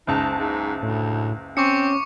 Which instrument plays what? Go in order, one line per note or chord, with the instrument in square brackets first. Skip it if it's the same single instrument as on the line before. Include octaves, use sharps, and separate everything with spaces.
[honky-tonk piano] F#1 C#2 A5 [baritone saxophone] D#4
[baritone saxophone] G#2
[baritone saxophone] D2 [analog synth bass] A2
[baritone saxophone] C4 [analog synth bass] C#4 [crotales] C#6 D6 C#7